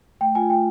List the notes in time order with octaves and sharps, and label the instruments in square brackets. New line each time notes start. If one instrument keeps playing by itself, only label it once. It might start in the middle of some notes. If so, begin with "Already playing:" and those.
[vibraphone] A3 [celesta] G5
[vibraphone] F4 [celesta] G#5
[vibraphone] A3 [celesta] G5